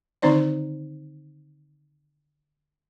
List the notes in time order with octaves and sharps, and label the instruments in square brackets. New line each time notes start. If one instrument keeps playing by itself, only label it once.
[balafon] D3 D#3 C4 D#4 C5 D5